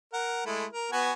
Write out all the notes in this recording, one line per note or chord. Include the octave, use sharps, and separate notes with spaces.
A#4 F#5
G#3 A3 E4
A#4
B3 F#4 G#5